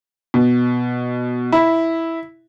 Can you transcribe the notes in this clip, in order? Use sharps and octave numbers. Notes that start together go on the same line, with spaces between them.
B2
E4